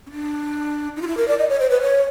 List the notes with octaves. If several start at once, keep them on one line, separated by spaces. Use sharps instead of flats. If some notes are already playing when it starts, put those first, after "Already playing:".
C#4
D4
D#4
F4
E4
A#4
D5
D#5
C#5
C5
B4
C#5